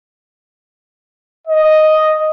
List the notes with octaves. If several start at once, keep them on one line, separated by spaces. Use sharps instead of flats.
D#5